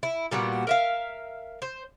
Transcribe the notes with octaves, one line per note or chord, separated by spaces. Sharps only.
E4
A#2 G3 B3 F#4
A#4 E5 F5
C5